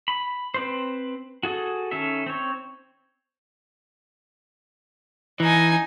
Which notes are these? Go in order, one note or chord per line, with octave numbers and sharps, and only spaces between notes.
B5
C4 B4 C5
F#4 G#4 A4
D#3 C#4 A4 E5
C4 C#5
E3 D#4 G#5